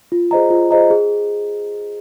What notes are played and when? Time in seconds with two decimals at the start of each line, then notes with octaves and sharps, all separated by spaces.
0.12 F4
0.31 G#4 C5 D#5 A#5
0.51 F4
0.71 G#4 C5 D#5 A#5
0.90 G#4